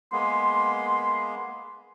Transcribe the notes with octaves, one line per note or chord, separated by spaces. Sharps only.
G#3 A#3 B3 C6